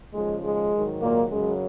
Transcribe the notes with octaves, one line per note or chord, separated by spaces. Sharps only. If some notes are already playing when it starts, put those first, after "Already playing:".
D#2 C#3 F3 G#3
G#3
G#2 D#3 F#3
A#2 A#3
F#2 C#3 F#3 G#3